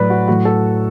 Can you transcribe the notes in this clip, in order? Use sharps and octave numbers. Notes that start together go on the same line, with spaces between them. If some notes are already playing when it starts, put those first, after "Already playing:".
Already playing: A2 F#3 B4 D5
F#4
A2 F#3 F#4
A4